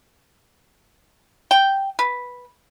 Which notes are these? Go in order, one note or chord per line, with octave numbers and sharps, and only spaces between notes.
G5
B4